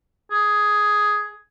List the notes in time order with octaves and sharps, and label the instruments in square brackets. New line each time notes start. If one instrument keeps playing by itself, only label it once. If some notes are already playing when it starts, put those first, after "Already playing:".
[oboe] G#4